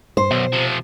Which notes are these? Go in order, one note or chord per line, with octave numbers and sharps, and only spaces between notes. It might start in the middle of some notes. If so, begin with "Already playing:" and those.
G2 C5
B1 F#2 B2
C3 F3